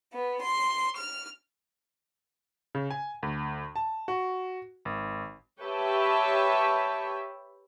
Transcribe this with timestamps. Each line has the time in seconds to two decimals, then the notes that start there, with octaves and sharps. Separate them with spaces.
0.11 B3
0.41 C6
0.96 F6
2.75 C#3
2.91 G#5
3.23 D2
3.76 A5
4.08 F#4
4.85 G#1
5.61 G4 B4 C#5 E5 G5 A5